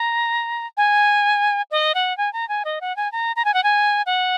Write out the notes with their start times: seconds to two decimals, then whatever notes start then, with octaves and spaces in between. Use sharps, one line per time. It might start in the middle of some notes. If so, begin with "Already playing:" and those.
Already playing: A#5
0.77 G#5
1.71 D#5
1.95 F#5
2.17 G#5
2.33 A#5
2.49 G#5
2.65 D#5
2.81 F#5
2.96 G#5
3.12 A#5
3.36 A#5
3.45 G#5
3.54 F#5
3.63 G#5
4.06 F#5